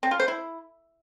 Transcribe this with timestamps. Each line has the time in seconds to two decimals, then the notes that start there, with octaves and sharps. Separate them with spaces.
0.03 C4
0.11 F4
0.20 C5
0.28 E4